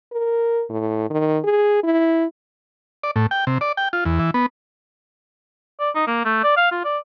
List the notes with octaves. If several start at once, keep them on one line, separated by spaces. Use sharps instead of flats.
A#4
A2
D#3
G#4
E4
D5
A2
G5
C3
D5
G5
F4
E2
E3
B3
D5
D#4
A#3
A3
D5
F5
F4
D5